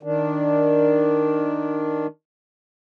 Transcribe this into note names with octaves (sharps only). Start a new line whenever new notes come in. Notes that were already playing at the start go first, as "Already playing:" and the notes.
D#3 D4